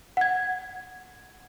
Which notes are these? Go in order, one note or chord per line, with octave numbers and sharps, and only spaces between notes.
F#5 G#6